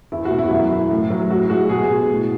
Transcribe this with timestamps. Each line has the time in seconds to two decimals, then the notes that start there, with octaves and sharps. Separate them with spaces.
0.12 E2 E4
0.25 F#4
0.31 B2
0.38 E4
0.50 F#2 E4
0.71 E3
0.91 A2
1.10 F#3
1.31 A2 F#4
1.50 G#3 F#4
1.69 B2 G#4
1.89 G#3
2.09 A2